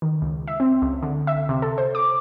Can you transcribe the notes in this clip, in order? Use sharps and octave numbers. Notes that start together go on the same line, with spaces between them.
D#3
C#2
E5
C4
C#2
D3
E5
C3
A4
C5
D6